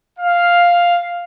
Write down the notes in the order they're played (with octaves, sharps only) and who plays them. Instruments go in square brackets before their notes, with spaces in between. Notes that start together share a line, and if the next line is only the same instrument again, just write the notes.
[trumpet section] F5